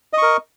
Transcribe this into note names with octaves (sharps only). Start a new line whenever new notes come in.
A#4 D#5 C#6